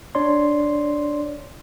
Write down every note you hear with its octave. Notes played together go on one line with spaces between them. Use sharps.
D4 C#5 D5 C6